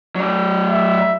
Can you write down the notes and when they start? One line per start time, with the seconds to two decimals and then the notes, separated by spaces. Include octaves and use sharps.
0.16 F#3 D5
0.69 E5